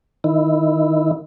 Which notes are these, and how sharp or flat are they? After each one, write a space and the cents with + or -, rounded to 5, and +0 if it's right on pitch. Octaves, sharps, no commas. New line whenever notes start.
D#3 +0 E4 +0